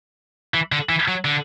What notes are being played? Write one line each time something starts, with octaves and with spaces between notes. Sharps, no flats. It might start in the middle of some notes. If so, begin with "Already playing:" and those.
E3
D3
E3
F#3
D3